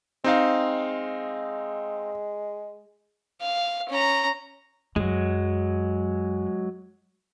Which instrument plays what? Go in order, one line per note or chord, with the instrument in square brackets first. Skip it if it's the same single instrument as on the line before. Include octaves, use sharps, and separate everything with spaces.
[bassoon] G#3 [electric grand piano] C4 D#4 F5
[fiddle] F5
C#4 A#5
[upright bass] F#2 [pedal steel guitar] F#3 G#3